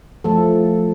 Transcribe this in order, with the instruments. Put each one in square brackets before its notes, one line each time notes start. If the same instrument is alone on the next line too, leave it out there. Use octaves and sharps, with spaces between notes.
[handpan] F3 A3 A4